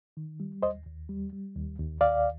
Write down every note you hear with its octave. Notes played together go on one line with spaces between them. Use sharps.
D#3
G3
D#2 C5 D#5
D#2
G3
G3
D#2
D#2
D#2 D5 F5